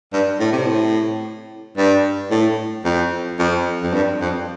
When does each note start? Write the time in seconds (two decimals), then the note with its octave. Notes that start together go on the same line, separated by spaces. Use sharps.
0.13 G2
0.40 A2
0.52 C3
0.66 A2
1.77 G2
2.30 A2
2.85 F2
3.39 F2
3.83 F2
3.93 G2
4.21 F2